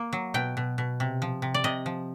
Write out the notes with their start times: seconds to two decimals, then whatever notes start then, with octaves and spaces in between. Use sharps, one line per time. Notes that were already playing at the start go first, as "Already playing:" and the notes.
Already playing: A#3
0.13 F#3
0.34 B2 G5
0.57 B2
0.78 B2
1.00 C3
1.22 F3
1.42 C3
1.54 D5
1.64 C3 D#5
1.86 F3